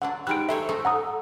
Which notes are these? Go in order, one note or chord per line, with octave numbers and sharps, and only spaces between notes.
D3 F#3 D4 F#5
G3 G#3 D#4 F#6 D7
F#3 A4 C5 C#5 E5
G#3 A3 D#4
F#5 A#5 D#6